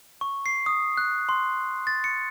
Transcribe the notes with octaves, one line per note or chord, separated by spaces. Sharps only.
C#6
C7
D#6
F#6
C6
A6
C#7